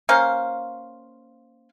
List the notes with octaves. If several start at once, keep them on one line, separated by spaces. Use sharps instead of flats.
A#3 C#4 C5 F5